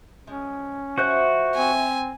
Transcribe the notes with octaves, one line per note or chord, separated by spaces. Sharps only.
F3 G#3 C#4
F3 A3 E4 F#4 C5 F#6
C4 G#5